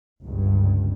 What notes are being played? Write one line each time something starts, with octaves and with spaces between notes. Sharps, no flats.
G1 C#2 G2